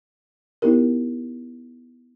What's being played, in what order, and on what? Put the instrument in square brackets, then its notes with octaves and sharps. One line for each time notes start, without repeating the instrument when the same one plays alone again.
[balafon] B3 D#4 E4 G4 A#4